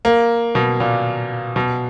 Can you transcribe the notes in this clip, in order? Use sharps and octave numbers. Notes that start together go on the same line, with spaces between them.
A#3
B2
A#2
B2